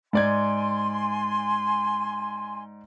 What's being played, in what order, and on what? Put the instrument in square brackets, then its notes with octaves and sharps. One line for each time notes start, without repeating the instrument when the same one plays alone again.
[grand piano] G#2 D5 G#6 [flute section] G#5 C6